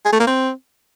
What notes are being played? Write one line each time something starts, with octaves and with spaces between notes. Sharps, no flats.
G#4
A3
A#3
C4